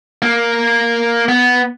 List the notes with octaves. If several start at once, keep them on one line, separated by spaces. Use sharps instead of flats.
A#3
B3